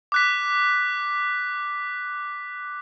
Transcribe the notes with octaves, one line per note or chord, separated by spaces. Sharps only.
D6 F#6 B6